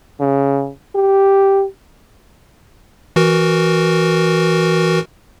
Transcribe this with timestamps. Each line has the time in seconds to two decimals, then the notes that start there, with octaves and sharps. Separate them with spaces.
0.20 C#3
0.95 G4
3.16 E3 F#4 A#4